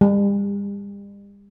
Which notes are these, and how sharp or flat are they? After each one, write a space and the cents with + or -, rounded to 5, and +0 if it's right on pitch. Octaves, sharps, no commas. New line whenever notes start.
G3 +40